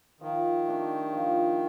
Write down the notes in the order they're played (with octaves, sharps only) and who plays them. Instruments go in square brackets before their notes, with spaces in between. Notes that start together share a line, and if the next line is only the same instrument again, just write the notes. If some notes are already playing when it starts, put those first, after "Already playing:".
[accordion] D#3 [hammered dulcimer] F3
[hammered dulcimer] A3 D4 G4
F3